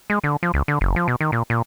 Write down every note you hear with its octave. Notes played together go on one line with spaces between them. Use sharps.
G#3
D3
F3
C#2
D3
F#1
F3
B2
D#3
A#2
A#2